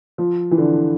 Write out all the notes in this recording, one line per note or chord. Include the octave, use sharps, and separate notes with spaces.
F3
E3
D3